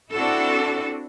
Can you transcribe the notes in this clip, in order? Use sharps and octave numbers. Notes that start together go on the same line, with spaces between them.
C4 D4 E4 F#4 A4